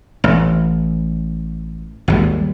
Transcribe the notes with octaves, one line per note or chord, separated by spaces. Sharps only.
A1
G#1 D#2 G3